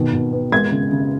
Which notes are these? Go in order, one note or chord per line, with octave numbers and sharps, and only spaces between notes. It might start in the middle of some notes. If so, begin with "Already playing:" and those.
Already playing: B2 D#3
B2
B3
G#3 G#6
C#3
C#3